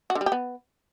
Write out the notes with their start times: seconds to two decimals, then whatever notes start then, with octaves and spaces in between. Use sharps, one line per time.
0.10 F#4
0.15 D3
0.21 G3
0.26 G4
0.32 B3